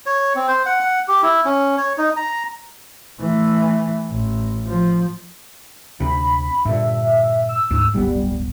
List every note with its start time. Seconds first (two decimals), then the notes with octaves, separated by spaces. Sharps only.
0.06 C#5
0.35 C4
0.48 C5
0.66 F#5
0.81 F#5
1.08 G4
1.22 E4
1.45 C#4
1.77 C#5
1.98 D#4
2.16 A#5
3.20 E3 A3
4.10 A1
4.67 F3
6.00 D2 C3 B5
6.65 G2 A#2 D3 E5
7.48 E6
7.71 D2 G#2
7.94 D1 G1 G3 B3